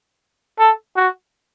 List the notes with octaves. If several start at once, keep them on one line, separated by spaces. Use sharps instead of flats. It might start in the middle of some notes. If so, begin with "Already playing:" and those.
A4
F#4